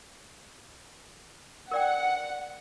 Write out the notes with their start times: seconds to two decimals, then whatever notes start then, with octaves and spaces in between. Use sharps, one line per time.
1.71 A#4 D5 F#5 G5